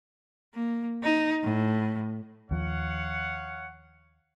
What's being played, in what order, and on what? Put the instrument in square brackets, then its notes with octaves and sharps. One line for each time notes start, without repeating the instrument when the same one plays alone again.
[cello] A#3
D#4
A2
[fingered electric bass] D#2 F3 [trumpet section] C#5 F5 F#5